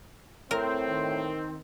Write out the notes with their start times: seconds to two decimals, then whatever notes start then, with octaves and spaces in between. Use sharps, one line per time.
0.51 A2 C4 A#4
0.89 D#3